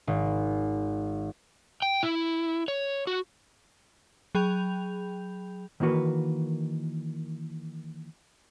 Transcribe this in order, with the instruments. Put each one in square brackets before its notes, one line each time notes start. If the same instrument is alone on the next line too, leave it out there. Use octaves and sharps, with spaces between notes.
[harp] G#1
[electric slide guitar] G5
E4
C#5
F#4
[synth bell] F#3 G#4 G5 B5 G6 F7
[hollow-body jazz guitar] D#3 E3 A#3 F#4 B4